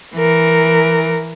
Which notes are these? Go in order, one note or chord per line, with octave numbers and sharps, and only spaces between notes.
E3 A#4